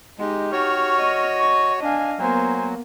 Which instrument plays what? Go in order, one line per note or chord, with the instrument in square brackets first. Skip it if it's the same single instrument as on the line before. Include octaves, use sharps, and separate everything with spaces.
[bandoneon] G#3 [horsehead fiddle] D#4 G4
[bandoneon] F#4 C#5 [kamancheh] C#6 F6
[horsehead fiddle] D#5
[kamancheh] C#6
[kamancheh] D4 G#5 [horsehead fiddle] D#5 F5
[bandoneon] F#3 [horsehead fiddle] A#3 B3 [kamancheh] C5 G#5